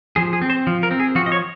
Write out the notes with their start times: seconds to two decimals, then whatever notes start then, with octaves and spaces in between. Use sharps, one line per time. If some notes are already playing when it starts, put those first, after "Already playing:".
0.16 F3 G#4
0.33 G#4
0.42 C4
0.50 C5
0.67 F3
0.83 A#4
0.91 C4
1.00 G#4
1.15 F3 F#4
1.26 D#5
1.32 C#5